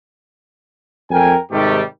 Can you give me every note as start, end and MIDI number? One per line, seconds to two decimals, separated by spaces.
1.10 1.36 41
1.10 1.36 70
1.10 1.36 79
1.10 1.36 80
1.51 1.82 44
1.51 1.82 48
1.51 1.82 51
1.51 1.82 55
1.51 1.82 57
1.51 1.82 67